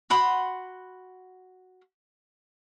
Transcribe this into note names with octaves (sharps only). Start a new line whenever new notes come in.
F#4 F#5 B5 C6